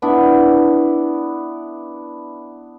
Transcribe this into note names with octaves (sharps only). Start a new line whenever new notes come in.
B3 D4 E4